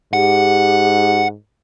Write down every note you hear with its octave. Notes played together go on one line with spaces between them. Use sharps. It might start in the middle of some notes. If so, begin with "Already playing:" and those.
G#2 G4 F#5